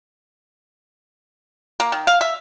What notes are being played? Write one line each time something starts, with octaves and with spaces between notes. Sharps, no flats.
A#3
D#3
F5
E5